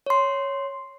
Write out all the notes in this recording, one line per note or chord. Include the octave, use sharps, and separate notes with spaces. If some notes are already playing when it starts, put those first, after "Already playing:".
C#5 C6